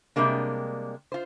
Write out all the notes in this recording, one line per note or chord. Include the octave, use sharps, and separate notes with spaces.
C3 G3 G#3 A#3 D4
F4 C5